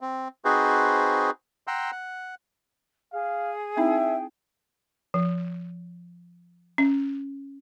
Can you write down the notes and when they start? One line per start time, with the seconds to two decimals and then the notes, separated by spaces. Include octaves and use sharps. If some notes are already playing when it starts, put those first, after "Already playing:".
0.01 C4
0.45 C4 D#4 F#4 G#4 B4 C5
1.67 F#5 G5 A#5 C6 E6
1.92 F#5
3.13 G#4 F5
3.77 C4 D#4 E4 E5 G5
5.14 F3
6.78 C#4